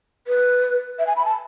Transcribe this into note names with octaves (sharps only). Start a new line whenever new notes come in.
B4
E5
G#5
B5
A5